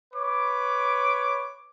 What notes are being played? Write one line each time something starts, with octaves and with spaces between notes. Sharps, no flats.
B4 C#5 D6